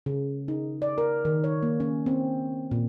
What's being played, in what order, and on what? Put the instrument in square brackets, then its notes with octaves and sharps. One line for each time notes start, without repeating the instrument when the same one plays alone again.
[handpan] C#3
D#4
D5
A#4
D#3
C#5
A#3
C#4
C4
A#2